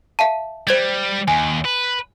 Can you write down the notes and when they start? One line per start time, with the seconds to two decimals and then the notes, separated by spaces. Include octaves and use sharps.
0.19 E5 F5 A5
0.67 G3 C5 G#6 A6
1.28 D#2 G#5
1.65 B4